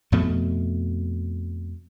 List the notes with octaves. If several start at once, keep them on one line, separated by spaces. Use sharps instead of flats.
F2 B2 A3